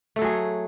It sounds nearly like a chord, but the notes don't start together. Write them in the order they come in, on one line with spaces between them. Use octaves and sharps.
A3 A4 F#3 G#4